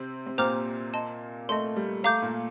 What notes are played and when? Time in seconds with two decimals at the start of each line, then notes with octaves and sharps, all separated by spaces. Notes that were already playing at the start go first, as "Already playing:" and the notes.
Already playing: C3 C4
0.26 C4
0.38 A#2 A#3 C5 G5 A#5 D6 F6
0.94 D#5 A5 C6
1.49 A3 D#5 A5 C6
1.76 G3
2.04 A3 F5 A#5 D6 G6
2.22 A#2 A#3